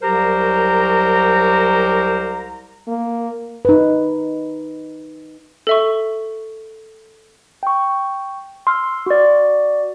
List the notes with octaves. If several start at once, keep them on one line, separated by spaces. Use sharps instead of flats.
C2 F#3 G4 A#4 C5 A#5
A#3
D#4 B4
A4 E5 C#6
G5 C#6
C6 E6 F6
F#4 D5